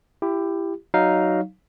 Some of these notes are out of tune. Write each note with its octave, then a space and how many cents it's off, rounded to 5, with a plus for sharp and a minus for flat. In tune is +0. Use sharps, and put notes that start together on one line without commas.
E4 +25 G4 +10
F#3 +15 D#4 +0 F5 +0